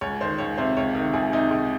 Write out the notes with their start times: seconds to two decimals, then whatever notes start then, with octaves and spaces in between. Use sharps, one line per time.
0.01 C#2 C#5
0.21 D#3 C5
0.38 C#2 C#5
0.57 C3 C5
0.77 C#2 C#5
0.95 D#3
1.13 C#2 G#4
1.33 C3 D#4
1.51 C#2